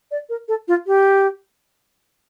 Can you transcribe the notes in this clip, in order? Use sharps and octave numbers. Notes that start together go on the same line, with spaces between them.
D5
A#4
A4
F4
G4